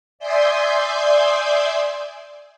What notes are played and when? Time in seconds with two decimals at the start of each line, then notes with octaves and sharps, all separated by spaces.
0.19 D5 E5 G#5 C6 D#6 G6